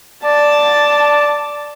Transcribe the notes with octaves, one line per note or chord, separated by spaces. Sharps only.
D5 A5